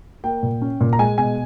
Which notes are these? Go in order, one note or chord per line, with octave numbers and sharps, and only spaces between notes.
A#3 G5
A#2
C#4
A#2
A#5
G#3 G#5
B2 G#5